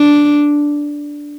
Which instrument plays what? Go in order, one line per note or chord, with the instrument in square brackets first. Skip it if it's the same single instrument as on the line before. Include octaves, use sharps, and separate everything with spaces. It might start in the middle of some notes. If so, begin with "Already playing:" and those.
Already playing: [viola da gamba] D4